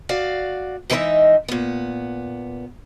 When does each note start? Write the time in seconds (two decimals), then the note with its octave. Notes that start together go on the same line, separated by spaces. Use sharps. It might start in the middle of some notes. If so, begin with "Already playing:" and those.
0.09 F#4 D5 F5
0.90 G#2 E3 D#4 B4 D#5 E5
1.48 A#2 B3